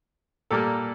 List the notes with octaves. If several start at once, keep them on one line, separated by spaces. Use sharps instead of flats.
A#2 G3 A#3 A4